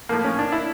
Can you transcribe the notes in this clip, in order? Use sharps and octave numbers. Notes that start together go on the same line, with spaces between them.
A2 F3 A#3
C#4
D4
E4